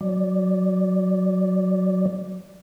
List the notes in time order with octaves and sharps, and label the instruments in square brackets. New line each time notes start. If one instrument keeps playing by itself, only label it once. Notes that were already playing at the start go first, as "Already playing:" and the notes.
[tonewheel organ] F#3 D5